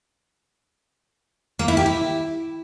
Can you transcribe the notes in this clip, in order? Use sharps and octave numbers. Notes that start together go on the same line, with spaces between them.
A#3
E4
G4
E4